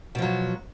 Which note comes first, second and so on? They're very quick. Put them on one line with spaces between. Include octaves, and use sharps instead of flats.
B2 F3 F#3